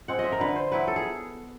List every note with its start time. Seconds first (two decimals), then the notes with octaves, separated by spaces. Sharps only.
0.08 G#3 C4 F#5
0.19 D#5
0.24 E5
0.32 A#4
0.40 D3 B4
0.56 C5
0.72 F#3 B3 E4 B4
0.88 A4
0.96 G#4